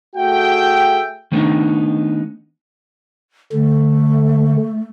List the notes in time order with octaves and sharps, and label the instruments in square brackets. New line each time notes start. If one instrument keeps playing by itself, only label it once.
[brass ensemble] A3 F#4 G#4 E5 G5
[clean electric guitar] D#3 A3 B3 C4 D4 D#4
[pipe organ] D3 [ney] A3